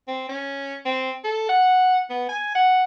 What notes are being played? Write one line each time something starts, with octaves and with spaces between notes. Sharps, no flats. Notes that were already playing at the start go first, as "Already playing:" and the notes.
C4
C#4
C4
A4
F#5
B3
G#5
F#5